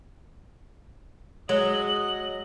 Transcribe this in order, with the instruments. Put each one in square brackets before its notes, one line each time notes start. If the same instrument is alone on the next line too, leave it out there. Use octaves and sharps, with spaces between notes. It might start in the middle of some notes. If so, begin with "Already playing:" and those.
[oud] F#3 [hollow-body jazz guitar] G#3 [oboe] D#5 [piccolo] F#7